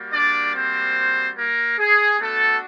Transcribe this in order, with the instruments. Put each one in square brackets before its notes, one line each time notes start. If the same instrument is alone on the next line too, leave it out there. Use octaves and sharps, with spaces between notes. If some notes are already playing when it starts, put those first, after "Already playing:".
Already playing: [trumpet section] G3 A#3 F#4
D4 D5
C4 C5
A#3 A#4
G#4
A3 B3 D4 F#4 A4